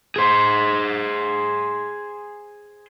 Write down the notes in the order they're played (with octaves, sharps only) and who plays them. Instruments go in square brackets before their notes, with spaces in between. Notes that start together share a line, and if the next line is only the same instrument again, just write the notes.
[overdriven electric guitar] G#4 C5